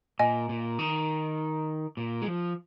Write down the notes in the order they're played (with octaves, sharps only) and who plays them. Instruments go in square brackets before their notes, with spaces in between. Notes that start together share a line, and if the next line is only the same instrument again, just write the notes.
[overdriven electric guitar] A#2 [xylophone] D#5 G#5
[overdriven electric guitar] A#2
D#3
A#2
G#3
F3